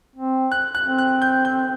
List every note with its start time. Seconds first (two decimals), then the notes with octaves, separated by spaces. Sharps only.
0.16 C4
0.52 F#6
0.75 F#6
0.86 C4
0.98 F#6
1.22 G6
1.45 G6